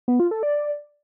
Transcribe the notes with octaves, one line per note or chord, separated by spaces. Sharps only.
B3
F4
A4
D5